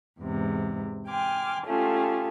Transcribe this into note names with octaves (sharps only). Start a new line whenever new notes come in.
E2 G#2 C3
G5 G#5 C6 D6 F6
A3 C#4 F4 G4 G#4